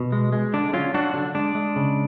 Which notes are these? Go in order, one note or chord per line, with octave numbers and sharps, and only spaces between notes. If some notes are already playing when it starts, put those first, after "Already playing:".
Already playing: B2
G#3
G#3
D3 D4
F#3 C#4 F4
F#3 D4 F#4
D3 D4
G#3 D4
G#3
C#3